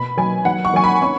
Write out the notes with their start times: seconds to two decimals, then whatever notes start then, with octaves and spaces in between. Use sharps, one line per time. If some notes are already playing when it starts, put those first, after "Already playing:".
Already playing: B2 B5
0.17 F#3 G#5
0.45 F#3 F#5
0.65 C#6
0.74 F#3 G#5
0.84 B5
1.02 C#4 C#6